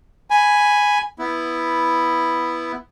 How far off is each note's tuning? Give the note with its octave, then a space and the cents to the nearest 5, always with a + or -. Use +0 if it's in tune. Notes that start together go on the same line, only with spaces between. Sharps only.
G#5 +0 B5 +0
B3 +0 E4 +0